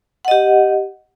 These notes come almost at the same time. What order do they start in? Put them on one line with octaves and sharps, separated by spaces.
F#5 D#5 G4